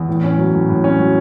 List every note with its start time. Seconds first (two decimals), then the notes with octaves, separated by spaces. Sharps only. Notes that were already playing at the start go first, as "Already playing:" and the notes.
Already playing: E2
0.08 A2
0.24 C#4
0.38 F#3
0.53 A2
0.69 A2
0.84 C#4
0.99 F#3